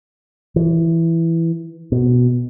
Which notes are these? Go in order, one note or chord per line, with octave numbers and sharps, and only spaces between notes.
E3
B2